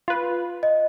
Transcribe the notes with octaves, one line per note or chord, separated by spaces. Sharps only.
F4 B4
D#5